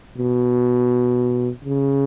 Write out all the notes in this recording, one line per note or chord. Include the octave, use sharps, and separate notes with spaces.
B2
C#3